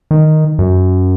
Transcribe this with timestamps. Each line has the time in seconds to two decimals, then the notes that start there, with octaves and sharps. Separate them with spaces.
0.11 D#3
0.59 F#2